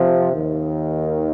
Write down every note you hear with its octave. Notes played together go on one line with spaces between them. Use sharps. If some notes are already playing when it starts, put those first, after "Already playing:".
Already playing: F2 C3 F3
D#2 D#3